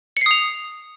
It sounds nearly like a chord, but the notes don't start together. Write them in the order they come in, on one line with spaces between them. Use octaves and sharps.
C#7 C7 D#6 F7